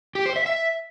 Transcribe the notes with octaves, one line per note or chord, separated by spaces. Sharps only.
G4
C5
E5
E5